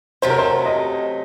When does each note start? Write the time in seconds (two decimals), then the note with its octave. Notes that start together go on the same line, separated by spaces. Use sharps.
0.22 C3 F#3 A3 C#4 C5
0.30 A#4
0.39 C5
0.66 D#5